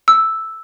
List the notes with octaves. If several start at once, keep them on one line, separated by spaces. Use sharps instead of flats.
E6